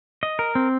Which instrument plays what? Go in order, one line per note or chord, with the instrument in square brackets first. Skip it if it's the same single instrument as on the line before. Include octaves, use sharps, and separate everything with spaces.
[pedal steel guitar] D#5
A#4
C4